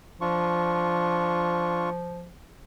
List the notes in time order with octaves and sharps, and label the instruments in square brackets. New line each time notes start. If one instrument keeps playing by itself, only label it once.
[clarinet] F3 [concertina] D4 F4 C#6